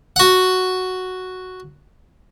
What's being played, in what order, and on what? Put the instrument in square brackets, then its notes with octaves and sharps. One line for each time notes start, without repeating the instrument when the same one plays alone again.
[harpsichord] F#4 F#5